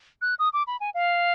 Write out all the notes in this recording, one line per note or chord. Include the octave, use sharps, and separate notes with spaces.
F#6
D#6
D6
B5
G#5
F5